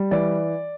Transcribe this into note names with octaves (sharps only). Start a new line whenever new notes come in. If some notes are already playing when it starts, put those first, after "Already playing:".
Already playing: G3
E3 D5